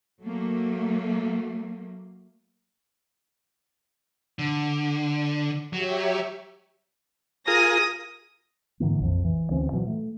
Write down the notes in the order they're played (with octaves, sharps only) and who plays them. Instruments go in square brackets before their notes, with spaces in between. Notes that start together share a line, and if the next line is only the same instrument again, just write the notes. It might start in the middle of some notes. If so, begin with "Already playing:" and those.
[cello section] F#3 A3 A#3
[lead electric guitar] D3
[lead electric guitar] F#3 [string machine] G4 C#5 E5
[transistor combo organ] F4 G#4 A#4 [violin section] D#6 A#6
[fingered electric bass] G#2 D3 E3 A#3
A#1 F2
E3
D2 E3 C4 C#4
A#2 E3 F#3
A3